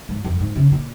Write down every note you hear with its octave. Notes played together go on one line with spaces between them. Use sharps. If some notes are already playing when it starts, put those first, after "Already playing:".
G#2
F2
G#2
C#3
A#2